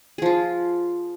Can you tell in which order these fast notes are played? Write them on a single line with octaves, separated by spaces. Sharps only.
G#4 F3 F4